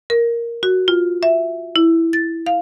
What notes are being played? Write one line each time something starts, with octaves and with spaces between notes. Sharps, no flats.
A#4
F#4
F4
E5
E4
A6
F5